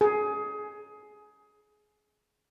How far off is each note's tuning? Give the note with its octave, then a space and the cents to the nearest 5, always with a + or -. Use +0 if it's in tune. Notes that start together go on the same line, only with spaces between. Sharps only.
G#4 +20